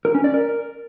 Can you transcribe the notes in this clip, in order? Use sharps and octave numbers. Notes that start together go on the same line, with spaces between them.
A#4
C#4
D5
A#4